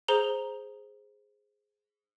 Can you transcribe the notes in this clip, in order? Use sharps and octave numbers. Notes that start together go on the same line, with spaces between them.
G#4 C5 A#5 G7